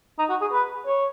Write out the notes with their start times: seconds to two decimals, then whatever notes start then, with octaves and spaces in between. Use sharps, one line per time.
0.19 D#4
0.30 F#4
0.41 G#4
0.52 B4
0.86 C#5